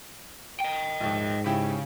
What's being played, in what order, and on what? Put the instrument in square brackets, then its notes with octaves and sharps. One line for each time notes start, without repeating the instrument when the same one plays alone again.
[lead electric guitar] D#5 G5
[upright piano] A#1 D#2 [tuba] G#2
[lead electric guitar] C#3 [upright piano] E4 G4